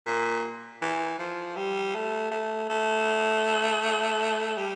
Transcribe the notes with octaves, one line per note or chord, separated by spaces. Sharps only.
A#2
E3
F3
G3
A3
A3
A3
G3